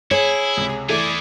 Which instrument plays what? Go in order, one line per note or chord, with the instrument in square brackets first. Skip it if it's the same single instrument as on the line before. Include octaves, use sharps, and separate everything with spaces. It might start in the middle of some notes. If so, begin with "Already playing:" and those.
[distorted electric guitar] E4 [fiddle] G#4 [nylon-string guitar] C#5
[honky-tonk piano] C#2 C3
[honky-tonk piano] E3 A3 [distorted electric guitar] E4 G#4 [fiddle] D5